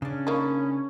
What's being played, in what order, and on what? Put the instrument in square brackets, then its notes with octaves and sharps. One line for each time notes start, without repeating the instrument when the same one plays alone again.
[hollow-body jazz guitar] C#3 D4 [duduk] C#4
[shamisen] A#3 D#4 [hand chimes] B5 C#6 D#6